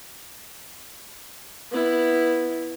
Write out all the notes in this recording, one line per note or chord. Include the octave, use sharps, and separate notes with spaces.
B3 E4